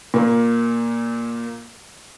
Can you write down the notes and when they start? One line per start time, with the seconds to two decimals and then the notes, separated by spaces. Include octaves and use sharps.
0.14 A#2 A#3